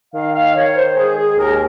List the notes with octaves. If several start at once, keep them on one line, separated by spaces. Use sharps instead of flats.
D#3 F5
F5
D#3 C#5
C5
G#3 G#4
G#4
D#2 A#4